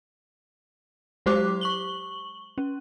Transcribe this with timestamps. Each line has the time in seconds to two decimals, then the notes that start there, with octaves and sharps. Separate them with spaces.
1.26 F#3 G#3 G4 C5 D6 F#6
1.61 C#6 F#7 G7
2.58 C#4